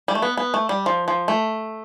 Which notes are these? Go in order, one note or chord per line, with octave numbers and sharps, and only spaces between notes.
G3
A3
B3
B3
A3
G3
F3
F3
A3